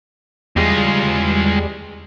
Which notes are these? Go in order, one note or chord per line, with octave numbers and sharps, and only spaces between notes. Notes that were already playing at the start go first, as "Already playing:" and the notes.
E2 G3 G#3 F4 G#4